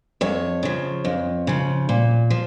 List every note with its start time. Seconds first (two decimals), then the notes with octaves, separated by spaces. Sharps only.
0.21 F2 C#5
0.63 C#3 F3
1.05 F2
1.47 C#3 F3
1.89 A#2
2.30 F3